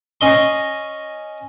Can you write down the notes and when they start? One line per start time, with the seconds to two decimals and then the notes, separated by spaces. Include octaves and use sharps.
0.21 C#4 D#5 C6